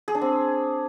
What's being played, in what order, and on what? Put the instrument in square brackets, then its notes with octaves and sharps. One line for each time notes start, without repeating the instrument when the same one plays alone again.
[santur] G#4
D4
C4